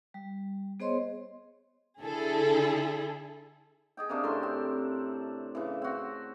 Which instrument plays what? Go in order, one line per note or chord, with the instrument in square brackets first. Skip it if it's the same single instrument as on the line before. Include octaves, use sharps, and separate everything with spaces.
[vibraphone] G3
B3 G#4 C5 C#5 D#5 C6
[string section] D3 E4 G#4 A4
[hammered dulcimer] G#4 D#5 G5
C3 A#3 C#4 D4
A2 A4 A#4 C6
C4
C#3 E3
C4 F#4